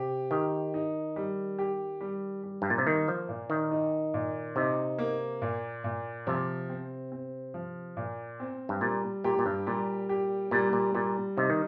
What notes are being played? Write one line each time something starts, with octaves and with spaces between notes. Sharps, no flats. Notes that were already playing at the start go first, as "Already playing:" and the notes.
Already playing: C3 G4
D#3 G4
D#4
G3
G4
G3
G3
G2
A#2
C3
D#3 A#3
F3
A#2
D#3
D#4
A#2
C3 D#4
A#3
A#2
A#2
C3 F3
C4
C4
F3
A#2
C4
G2
A#2 G3
A#2 G4
A#2
G2
A#2 G3
G4
A#2 G3
A#2
A#2 G3
C3 D#4
D#3